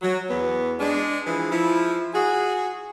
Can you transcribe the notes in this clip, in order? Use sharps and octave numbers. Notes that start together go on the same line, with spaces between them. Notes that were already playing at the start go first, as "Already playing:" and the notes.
F#3
E2 B3
G#3 D4
E3 F3 E4 G#4
F3 E4
F#4 G#4